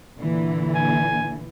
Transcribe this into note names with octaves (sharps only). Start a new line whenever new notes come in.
A#2 D3 E3
G#5